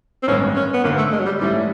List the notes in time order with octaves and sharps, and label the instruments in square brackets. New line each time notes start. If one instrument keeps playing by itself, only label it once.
[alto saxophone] C4
[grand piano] A1 G2 D#3 G#3 B3 [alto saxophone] C#4
[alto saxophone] C#4
B3
[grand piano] G#1 F#2 D3 [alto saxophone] A#3
[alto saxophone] A3
G#3
F#3
G3
[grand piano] G#2 E3 A3 C#4 E4 [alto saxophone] G3